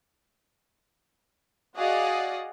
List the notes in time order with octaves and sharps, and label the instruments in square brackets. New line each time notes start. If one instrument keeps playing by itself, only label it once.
[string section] F#4 G#4 D5 D#5 F5 F#5